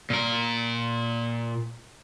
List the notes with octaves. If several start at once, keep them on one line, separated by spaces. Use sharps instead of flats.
A#2 A#4